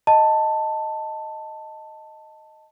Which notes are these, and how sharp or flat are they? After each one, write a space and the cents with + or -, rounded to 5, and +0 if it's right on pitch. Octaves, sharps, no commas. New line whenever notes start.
D#5 +0 A5 +10